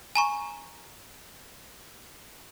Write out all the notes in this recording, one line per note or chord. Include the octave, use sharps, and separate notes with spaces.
G#5 A#5 C#6